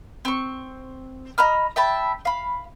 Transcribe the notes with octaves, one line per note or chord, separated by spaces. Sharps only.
C4 C#6
D#5 A#5 B5 F6
E5 G5 A5 B5
F5 B5